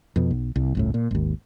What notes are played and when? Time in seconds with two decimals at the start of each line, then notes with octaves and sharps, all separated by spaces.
0.16 F2 B2
0.31 B1
0.56 C2
0.75 G1 C#2 A2
0.94 A#2
1.11 G#1 D#2